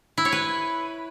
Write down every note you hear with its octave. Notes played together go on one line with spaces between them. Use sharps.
E4
C#5
B4